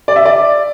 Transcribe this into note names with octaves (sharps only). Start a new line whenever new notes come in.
D5
E5
D5